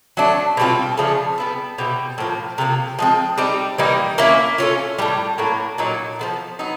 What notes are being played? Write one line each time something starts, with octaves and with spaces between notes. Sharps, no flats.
F#3 A3 D4
B2 G3 C4 F4
C#3 F3 A3 D4
G3 B3 E4
B2 G3 C4 E4
A2 F3 A#3
C3 F3 A#3
F3 G#3 C4
G3 C4 D#4 G4
E3 G3 A#3 D#4
A#3 C#4 E4
A3 C#4 F4
A2 E3 G3
A2 F#3 A#3
A#2 F#3 A#3 D#4
F3 G#3 B3
F#3 B3 D#4